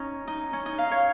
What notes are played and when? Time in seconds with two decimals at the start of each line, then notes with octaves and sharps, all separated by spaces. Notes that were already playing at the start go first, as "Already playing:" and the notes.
Already playing: C#4 D#4
0.27 D#4
0.53 C#4
0.66 D#4
0.78 F5
0.91 C#5